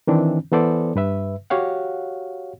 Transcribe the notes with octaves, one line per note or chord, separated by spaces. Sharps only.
D#3 E3 C4 D4
E3 B3 A4 C5 D5
G2 B4 E5
F#4 G4 C#5 F5 F#5